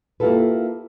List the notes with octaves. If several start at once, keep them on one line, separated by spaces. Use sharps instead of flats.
A#3 E4 F4 G4 A4 B4